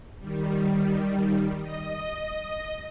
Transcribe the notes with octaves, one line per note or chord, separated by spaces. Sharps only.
D#3 G3
D#5